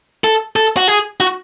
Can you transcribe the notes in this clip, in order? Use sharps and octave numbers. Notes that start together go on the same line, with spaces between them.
A4
A4
F#4
G#4
F#4